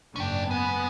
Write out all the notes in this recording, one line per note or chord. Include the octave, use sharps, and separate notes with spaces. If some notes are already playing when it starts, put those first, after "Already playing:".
F#1 G#2 C#4 D4 G5
G#3 B3